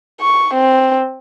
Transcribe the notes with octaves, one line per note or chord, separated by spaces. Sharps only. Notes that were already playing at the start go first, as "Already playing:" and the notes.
C#6
C4